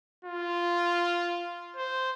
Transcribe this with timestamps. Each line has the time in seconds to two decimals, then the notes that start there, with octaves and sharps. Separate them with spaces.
0.25 F4
1.76 C5